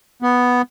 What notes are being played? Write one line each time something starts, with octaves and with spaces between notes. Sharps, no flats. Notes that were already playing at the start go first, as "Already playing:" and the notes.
B3